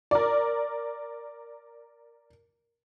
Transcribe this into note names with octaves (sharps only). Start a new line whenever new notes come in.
A#4 D5